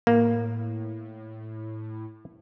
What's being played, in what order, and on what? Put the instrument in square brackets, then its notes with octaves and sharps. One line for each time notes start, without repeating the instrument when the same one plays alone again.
[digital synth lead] A2 [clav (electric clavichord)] A#3